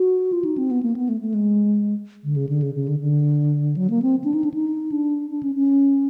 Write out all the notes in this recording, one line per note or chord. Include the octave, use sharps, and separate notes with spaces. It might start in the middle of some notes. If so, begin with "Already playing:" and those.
Already playing: F#4
F4
D#4
C4
B3
A#3
B3
A3
A3
G#3
D3
C#3
D3
C#3
C#3
D3
D3
F#3
A#3
C4
D4
D#4
D4
D#4
D4
D4
C#4
C#4